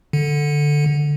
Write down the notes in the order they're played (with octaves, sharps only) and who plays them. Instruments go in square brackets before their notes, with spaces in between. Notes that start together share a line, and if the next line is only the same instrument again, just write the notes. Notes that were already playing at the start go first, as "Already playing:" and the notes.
[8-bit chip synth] D3